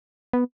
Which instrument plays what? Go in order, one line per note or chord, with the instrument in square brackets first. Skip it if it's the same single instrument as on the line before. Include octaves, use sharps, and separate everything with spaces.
[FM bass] B3